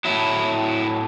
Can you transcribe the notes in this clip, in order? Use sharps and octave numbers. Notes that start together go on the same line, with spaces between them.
A2 F#3 E4